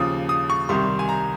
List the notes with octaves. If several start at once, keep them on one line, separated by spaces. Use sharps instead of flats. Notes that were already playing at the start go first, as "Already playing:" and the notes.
Already playing: D#2 C#3 F3 D#6
D#6
C#6
C2 C3 D#3 G3 C6
G#5
A#5